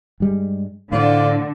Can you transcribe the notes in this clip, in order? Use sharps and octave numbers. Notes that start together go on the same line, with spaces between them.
G2 G3 G#3
A2 D3 F4 C5 D5